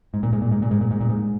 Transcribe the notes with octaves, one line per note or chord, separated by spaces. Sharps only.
G#2
A#2
G#2
A#2
G#2
A#2
G#2
A#2
G#2
A#2
G#2